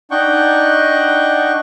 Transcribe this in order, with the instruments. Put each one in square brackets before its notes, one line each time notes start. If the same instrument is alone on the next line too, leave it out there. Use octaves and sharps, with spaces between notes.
[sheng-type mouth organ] D4 D#4 F#5 G5 C#6